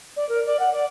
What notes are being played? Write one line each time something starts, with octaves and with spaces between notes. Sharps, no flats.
D5
A#4
D5
F#5
D5